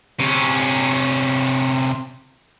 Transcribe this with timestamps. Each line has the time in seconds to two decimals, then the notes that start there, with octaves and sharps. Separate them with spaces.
0.20 C3 C#4